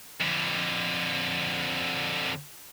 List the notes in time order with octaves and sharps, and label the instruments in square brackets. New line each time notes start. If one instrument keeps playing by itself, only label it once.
[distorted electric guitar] F2 D3